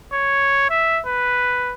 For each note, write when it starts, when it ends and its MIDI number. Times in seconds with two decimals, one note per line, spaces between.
0.13 0.65 73
0.70 1.01 76
1.06 1.74 71